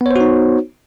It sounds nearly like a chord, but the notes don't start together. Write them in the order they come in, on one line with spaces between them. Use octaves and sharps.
B3 C#5 C5 F#4 D#4